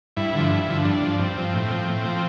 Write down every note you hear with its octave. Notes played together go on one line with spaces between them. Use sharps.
G2 E4
D3 F3
G2
D3 F3
G2 D4
F3
G2 C4
F3
A2
F3
A2
F3